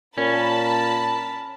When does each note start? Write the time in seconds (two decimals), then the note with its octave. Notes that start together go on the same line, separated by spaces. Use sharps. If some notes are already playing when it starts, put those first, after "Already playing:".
0.18 A#2 C#4 A#4 A5 B5